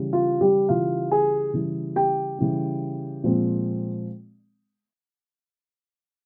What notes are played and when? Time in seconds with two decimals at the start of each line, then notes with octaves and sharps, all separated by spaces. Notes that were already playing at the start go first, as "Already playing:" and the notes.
Already playing: C#3 E3 G3
0.13 F4
0.41 G3 G4
0.69 C#3 E3 G3 F4 F5
1.11 G#4 G#5
1.54 C#3 E3 G3
1.96 G4 G5
2.39 C#3 E3 G3
3.24 A#2 F3 G#3 C4